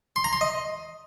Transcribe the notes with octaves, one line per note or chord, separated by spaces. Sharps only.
C6
A#5
C6
D#5